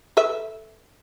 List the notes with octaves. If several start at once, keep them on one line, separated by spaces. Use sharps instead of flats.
A4 B4 E5